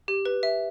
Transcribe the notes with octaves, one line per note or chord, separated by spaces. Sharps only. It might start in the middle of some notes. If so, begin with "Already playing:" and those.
G4
B4
E5